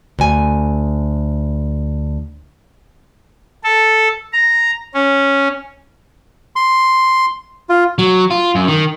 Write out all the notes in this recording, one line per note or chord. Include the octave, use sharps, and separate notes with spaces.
D2 G#5
A4
A#5
C#4
C6
F4
F#3
F4
F#2
D#3